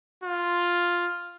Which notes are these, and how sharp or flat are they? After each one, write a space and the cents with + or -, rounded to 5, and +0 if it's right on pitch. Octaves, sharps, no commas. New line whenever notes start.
F4 +0